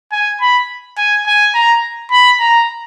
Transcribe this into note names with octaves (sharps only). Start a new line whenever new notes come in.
G#5
B5
G#5
G#5
A#5
B5
A#5